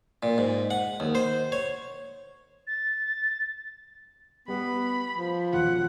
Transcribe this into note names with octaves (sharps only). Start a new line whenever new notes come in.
A#2
G#2
F#5
D#2
C5
C#5
A6
G3 B3 B5
F3
E1 F4 F#5